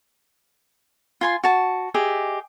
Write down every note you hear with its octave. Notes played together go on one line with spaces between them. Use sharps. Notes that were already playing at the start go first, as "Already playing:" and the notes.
F4 G#5 C6
F#4 A5
G4 G#4 D#5 E5